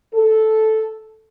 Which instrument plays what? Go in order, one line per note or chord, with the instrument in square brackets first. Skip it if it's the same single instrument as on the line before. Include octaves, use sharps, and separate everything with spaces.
[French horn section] A4